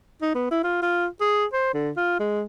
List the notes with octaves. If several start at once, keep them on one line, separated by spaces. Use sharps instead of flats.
D#4
B3
E4
F4
F4
G#4
C5
D3
F4
G#3